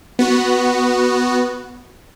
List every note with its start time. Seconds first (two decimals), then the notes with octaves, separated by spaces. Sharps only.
0.19 B3 F#4